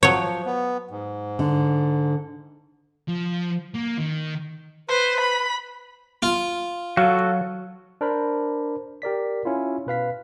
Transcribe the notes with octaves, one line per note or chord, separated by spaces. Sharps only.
F3 F#3 C#5
B3
G#2
D3
F3
A#3
D#3
B4 C5
B5
F4
F#3 F#4 A4 F5
D4 A#4 C5 B5
G4 A#4 D5 B6
C#4 E4 F4
B2 B4 F5 B6